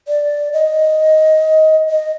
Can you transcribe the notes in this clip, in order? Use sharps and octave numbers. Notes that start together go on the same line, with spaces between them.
D5
D#5
D#5